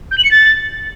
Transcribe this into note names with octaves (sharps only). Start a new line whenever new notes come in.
G6
F#7
C#7
A6